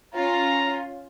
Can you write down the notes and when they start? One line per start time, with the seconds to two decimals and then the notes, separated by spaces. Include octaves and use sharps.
0.14 C#4 F4 A#5